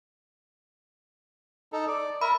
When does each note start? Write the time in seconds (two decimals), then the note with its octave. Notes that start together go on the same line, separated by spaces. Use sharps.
1.72 D#4 A4
1.88 D5
2.21 A#4 E5 B5